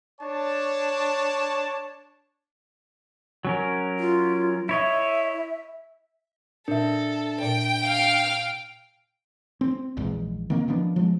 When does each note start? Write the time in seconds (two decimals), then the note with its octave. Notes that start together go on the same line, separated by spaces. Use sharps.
0.20 D4 C#5 A5
3.45 F#3 C#4 A#4
3.99 F4
4.69 E4 C#5 D#5 E5
6.68 A#2 D4 A4 E5
7.41 A#2 D5 G5
7.85 F5 F6
9.61 C4
9.97 A#1 E2 G#2
10.50 D#3 A#3 C4
10.68 D#3 F3 B3 D4
10.96 F3 G#3